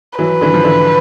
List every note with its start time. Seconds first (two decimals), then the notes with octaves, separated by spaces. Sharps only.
0.19 E3 F#3 B4
0.41 D3 E3
0.54 F3
0.64 D3 E3